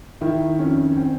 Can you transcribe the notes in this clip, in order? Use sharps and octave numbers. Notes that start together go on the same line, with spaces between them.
D#3 E4
F2 C#4
C4